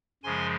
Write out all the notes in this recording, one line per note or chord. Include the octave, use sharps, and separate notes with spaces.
F#2 C#3 F3 G#3 G#5 C6